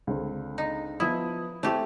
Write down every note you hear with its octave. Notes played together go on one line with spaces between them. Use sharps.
C#2 D3 C4
D#4
F3 B3 E4 D#6
A3 C4 E4 G4